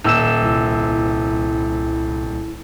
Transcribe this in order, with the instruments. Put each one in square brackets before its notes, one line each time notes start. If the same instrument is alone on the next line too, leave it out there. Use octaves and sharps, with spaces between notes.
[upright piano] D#1 E6 E7
[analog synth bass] C2 [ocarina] E4